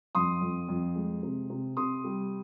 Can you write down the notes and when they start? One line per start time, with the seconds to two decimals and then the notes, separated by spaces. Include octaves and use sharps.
0.15 F2 C6 D#6
0.41 F2
0.69 F2
0.96 G#3
1.23 C3
1.50 C3
1.77 C3 C6 D#6
2.04 G3